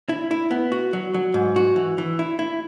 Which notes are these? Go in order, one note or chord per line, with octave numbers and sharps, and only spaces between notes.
E4
E4
B3
F#4
F#3
F#3
G#2
F#4
E3
E3
E4
E4